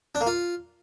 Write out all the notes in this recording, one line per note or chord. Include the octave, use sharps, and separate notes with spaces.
D4
A#3
F4